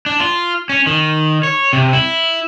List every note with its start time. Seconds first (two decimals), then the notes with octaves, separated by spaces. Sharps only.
0.06 D4
0.20 F4
0.69 C#4
0.87 D#3
1.43 C#5
1.73 C3
1.93 E4